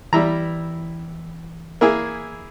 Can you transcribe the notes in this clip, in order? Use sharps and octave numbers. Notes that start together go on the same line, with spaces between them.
E3 G3 E4 A#5
A#3 E4 G#4